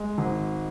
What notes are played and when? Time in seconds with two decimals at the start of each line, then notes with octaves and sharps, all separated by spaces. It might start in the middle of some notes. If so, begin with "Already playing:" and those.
Already playing: G#3
0.18 G#1